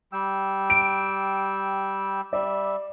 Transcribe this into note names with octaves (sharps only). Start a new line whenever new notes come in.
G3 G5 E6
D7
G3 D5 E5